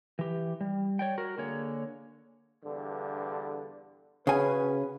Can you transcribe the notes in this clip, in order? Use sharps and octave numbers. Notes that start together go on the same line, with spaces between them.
E3 G4
G3
C#5 D5 G5
F#4 A#4
D3 A#3 G#4 C#5
E2 G2 D3
C#3 C#4 F#4 B4 G#5